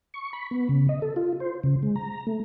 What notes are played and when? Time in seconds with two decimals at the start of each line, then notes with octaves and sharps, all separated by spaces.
0.14 C#6
0.33 B5
0.51 B3
0.69 C#3
0.89 D#5
1.02 A4
1.16 F4
1.40 C5
1.63 C#3
1.83 G#3
1.96 A#5
2.27 A3